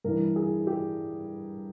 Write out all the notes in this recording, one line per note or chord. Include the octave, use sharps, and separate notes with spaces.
G2 E3 A#4
G#4
G4